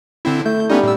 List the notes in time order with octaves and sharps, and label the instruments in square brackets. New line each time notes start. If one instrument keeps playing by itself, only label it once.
[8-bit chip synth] D3 C4 E4
[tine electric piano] A3 [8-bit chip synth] G6
[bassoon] G3 [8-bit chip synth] B3 C#4 D#4
[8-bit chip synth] A2 E6